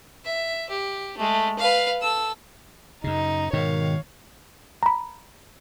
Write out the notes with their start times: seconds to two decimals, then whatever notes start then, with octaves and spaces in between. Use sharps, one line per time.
0.24 E5
0.69 G4
1.17 G#3 A3
1.58 B4 F5
2.01 A4 E6
3.04 F#2 C#3 D#4
3.53 G#2 B2 D#3 C#5 F5
4.83 A#5 B5